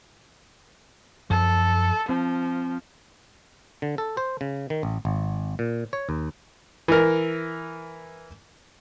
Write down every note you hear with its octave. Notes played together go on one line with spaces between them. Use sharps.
F#2 F3 A4
F3 C4
D3
A4
C5
C#3
D#3
A1
G#1
A#2
C#5
D#2
E3 A#4